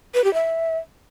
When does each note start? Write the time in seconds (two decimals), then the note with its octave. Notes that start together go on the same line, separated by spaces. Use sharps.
0.14 B4
0.24 G4
0.34 E5